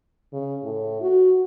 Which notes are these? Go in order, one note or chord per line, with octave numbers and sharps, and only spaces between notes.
C#3
A2
F#4